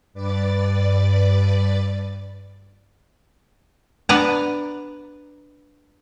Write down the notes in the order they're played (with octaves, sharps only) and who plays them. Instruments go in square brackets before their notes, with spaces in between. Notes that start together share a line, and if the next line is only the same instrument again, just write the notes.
[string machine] G2 B4 D5 D6 A6
[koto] B3 D4 B4 D5 F#5 A#5